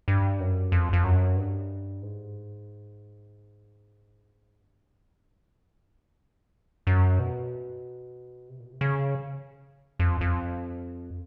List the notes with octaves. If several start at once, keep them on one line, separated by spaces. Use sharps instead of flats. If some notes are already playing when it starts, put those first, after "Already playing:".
G2
F#2
F2
F2
F#2
G2
G#2
G2
F#2
E2
F2
F#2
B2
C3
A#2
B2
C3
C#3
F2
F2